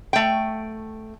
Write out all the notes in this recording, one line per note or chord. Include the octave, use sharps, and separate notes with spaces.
A3 G5